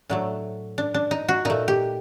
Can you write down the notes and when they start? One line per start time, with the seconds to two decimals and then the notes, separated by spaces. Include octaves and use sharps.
0.09 A2 F#3 A3 D4
0.78 D4
0.94 D4
1.11 D#4
1.29 F#4
1.45 A#2 A3 D#4
1.68 G4